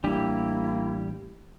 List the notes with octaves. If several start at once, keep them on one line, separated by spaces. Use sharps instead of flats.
A1 G3 A#3 D4 E4 G4